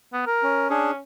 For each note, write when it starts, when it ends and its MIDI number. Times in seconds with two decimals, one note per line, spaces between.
0.13 0.22 59
0.26 0.68 70
0.43 0.70 61
0.70 0.99 61
0.70 0.91 62
0.70 0.91 68